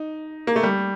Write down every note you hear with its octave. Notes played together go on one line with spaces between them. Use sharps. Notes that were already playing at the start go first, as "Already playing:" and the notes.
Already playing: D#4
A#3
A3
G3